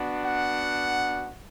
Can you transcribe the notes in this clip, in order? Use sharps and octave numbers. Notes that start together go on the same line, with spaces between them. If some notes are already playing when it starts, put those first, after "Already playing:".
Already playing: B3 D4 F#4
F#5